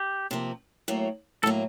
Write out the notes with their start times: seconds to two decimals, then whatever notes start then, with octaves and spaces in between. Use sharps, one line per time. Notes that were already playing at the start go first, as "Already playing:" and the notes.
Already playing: G4
0.31 C3 F3 A#3
0.88 A2 F#3 A#3
1.43 A2 F#3 A#3 A4